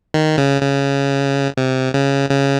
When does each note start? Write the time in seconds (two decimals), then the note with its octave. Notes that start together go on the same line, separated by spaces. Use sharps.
0.14 D#3
0.38 C#3
0.62 C#3
1.57 C3
1.94 C#3
2.29 C#3